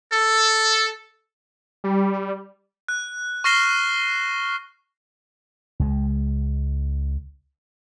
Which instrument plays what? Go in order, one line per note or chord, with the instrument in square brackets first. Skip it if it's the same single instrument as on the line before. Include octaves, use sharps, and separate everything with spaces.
[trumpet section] A4
[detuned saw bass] G3
[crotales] F#6
C#6 F6 A#6 C7 E7 G7
[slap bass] C#2 G#3